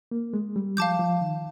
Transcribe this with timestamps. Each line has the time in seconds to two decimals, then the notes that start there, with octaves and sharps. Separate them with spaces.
0.11 A#3
0.34 G#3
0.56 G3
0.77 F3 F5 A5 D6 G6
0.99 F3
1.21 D#3